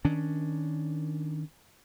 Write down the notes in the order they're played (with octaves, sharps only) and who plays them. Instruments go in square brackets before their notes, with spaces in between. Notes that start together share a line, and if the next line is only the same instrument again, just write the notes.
[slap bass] D#3 C#4 D4